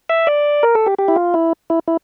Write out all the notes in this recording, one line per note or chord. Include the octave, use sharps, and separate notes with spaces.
E5
D5
A#4
A4
G4
G4
E4
F4
E4
E4
E4